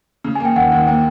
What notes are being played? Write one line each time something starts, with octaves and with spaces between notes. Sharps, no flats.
C#3
G#5
A#3
G5
D#2 F#5
D#2 F#5
A#3 G5